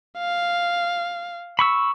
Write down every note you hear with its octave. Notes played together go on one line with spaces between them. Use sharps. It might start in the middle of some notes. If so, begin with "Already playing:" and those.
F5
B5 C#6 E6